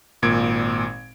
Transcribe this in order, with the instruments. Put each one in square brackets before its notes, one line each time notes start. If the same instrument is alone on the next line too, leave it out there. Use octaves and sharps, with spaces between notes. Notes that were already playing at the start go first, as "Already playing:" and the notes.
[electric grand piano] G#1 A#2 G#6 D7